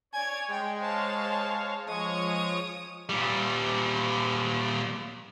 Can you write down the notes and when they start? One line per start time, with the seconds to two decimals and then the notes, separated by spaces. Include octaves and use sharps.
0.13 C#5 D5 G#5 G#6
0.50 G#3 G5
0.80 C5 C#5 F5 A5
1.88 F3 G#3 C#5 C#6 D#6
3.09 A#2 G3